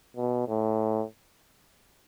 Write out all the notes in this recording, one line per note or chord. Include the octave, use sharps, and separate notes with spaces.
B2
A2